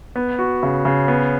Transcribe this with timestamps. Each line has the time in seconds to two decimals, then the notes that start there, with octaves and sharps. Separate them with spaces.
0.16 B3
0.39 F#4
0.63 C#3
0.85 C#3
1.08 B3